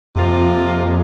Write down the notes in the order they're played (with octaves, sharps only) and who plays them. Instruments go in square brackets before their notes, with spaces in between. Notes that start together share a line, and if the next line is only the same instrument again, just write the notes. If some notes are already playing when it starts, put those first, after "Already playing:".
[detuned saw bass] F2 [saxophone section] C3 F3 A#3 F4
[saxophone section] A#2 G#3